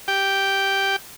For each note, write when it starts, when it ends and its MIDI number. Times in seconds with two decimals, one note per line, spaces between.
0.08 0.96 67
0.08 0.96 79